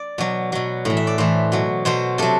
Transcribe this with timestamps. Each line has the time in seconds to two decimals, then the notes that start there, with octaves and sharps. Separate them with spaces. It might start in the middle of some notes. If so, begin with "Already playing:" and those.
Already playing: D5
0.18 B2 F#3
0.52 B2 F#3
0.85 A2 E3
0.97 E5
1.07 D5
1.18 A2 E3 C5
1.52 B2 F#3
1.85 B2 F#3 C5
2.18 C3 F#3 A4